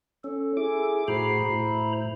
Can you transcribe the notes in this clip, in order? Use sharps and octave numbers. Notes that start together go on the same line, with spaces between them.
C#4 A4
E4 G#4 D6
A2 F#4 G#4 C5 A#5 B5 C7
A2 E4